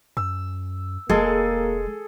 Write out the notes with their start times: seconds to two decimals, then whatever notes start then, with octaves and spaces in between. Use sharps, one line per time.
0.17 F#2 E6
1.09 E1 G#3 A#3 G#4 A4